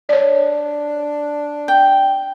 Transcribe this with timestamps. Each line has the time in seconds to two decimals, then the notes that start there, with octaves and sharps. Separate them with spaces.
0.09 D4 C#5 D5
1.68 G5